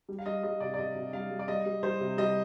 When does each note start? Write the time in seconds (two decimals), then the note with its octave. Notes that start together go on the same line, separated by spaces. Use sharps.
0.09 G3
0.19 F5
0.26 G3 D#5
0.43 G3 D#5
0.60 C3 D5
0.74 D5
0.78 C3 D#5
0.96 C3
1.13 G3 F5
1.31 G3
1.39 D5
1.48 G3 D#5
1.66 G3
1.83 G3 C5
2.00 C3
2.18 G3 D#5